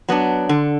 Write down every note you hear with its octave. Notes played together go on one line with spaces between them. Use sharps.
F#3 B3 D4
D3